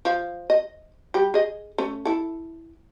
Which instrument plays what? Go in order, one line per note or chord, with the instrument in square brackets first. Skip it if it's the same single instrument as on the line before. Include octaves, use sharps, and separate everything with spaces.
[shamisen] F3 F5
D#5
G3 G4
G#4 D#5
A3 C#4
E4 A4